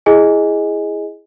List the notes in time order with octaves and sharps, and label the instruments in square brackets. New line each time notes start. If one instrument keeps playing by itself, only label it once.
[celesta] E4 G#4 D#5 G#5